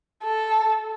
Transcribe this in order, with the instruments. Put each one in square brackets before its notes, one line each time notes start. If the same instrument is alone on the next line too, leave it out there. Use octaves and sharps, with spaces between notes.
[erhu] A4